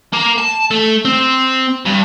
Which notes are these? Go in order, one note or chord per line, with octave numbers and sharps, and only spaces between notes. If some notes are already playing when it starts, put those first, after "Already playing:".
A#3
A5
A3
C4
G2